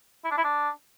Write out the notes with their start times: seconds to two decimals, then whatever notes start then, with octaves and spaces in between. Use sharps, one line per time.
0.25 E4
0.31 D4
0.38 E4
0.44 D4